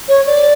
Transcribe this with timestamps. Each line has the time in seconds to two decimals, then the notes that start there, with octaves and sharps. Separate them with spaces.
0.08 C#5
0.26 D5